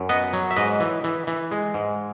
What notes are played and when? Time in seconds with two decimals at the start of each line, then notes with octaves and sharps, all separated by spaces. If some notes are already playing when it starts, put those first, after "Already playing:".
Already playing: F#2
0.09 B3 D#5 F#5
0.33 F#3
0.51 E5
0.56 G#2 B4 D#5
0.80 E3
1.04 E3
1.27 E3
1.51 G#3
1.74 G#2